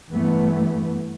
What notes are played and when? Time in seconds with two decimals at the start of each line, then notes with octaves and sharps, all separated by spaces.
0.10 G2 E3 A3 B3